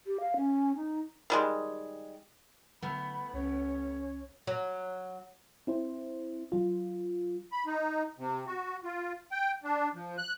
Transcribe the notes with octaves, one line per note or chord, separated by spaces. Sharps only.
G4
F5
C#4
D#4
D#3 G3 G#3
A2 D3 F#3 B3 B5
C#2 C#4 C#5
F#3
C4 E4 C5
F#3 F4
B5
D#4
C3
F#4
F4
G5
D4
F3
F#6